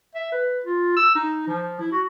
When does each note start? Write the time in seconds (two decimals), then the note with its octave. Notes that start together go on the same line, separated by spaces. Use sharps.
0.15 E5
0.32 B4
0.64 F4
0.97 E6
1.15 D#4
1.47 F3
1.80 E4
1.92 F#4